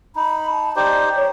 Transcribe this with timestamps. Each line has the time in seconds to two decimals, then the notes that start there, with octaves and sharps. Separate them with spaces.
0.16 D#4 B5
0.51 A5
0.76 D#4 G4 C5 D5
1.16 C#5